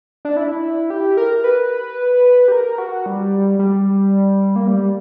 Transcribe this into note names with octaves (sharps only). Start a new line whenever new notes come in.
D4
E4
G4
A#4
B4
G4
A#4
F#4
G3
G3
A#3
G3